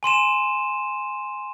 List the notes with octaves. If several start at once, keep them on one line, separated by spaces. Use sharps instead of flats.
G#5 C6 D#7 E7